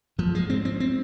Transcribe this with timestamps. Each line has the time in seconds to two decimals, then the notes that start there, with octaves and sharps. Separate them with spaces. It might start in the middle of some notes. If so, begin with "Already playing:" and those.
0.18 G#2 F3
0.35 G#3
0.50 C4
0.65 C4
0.80 C4